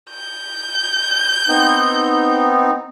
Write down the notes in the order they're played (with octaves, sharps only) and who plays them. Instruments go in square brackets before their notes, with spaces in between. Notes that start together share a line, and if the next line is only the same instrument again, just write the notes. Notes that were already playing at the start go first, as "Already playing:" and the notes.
[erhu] G6
[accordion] B3 C4 D#4